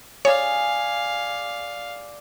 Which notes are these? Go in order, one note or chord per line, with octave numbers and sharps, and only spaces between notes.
G#4 C#5 D5 F5